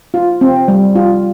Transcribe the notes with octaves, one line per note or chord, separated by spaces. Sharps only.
F4
C4
G3
F4